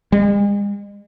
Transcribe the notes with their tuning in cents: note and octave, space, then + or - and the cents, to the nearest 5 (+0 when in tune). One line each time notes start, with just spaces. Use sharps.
G#3 -40